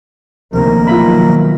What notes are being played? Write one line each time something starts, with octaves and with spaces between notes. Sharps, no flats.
D2 C3 D#3 F3 A#3 A#4
B2 D#3 F#3 F4 E5 B5